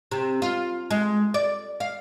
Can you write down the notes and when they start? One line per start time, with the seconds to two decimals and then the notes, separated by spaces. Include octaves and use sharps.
0.11 C3
0.42 F4
0.91 G#3
1.34 D5
1.80 F5